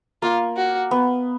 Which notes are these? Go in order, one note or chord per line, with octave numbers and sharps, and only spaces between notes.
A#3 F4
F#4
B3